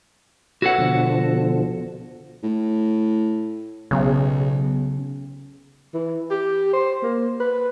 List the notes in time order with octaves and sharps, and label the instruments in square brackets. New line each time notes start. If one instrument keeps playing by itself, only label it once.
[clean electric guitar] F#4 A4 F#5 [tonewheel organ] B4 C#5 E5
[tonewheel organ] B2 D3 F3
[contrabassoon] A2
[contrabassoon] B1 [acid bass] C#3
[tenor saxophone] E3
G4
C5
A#3
B4